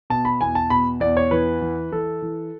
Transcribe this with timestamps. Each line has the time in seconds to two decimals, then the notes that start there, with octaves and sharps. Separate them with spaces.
0.10 B2 A5
0.25 B5
0.41 E2 G#5
0.55 A5
0.70 B2 B5
1.00 E2 D5
1.17 C#5
1.31 E3 B4
1.61 E3
1.92 E3 A4
2.22 E3